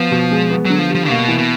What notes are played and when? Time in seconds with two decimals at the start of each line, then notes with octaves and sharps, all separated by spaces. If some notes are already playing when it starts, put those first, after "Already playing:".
Already playing: F3 B3
0.11 B2
0.31 G#3
0.50 B3
0.65 D3 F#3
0.79 F3
0.89 G3
0.95 F3
1.09 B2 A#3
1.28 E3
1.38 B2